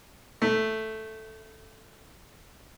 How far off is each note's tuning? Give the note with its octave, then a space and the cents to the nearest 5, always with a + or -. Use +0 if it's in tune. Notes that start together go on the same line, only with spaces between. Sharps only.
A3 +0